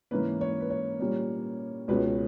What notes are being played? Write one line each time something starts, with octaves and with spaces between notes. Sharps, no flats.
G#2 E3 A#3 C#4 B4
C#5
B4
C#5
A#2 G3 A#3 C#4
C#2 B2 G#3 C#4 B4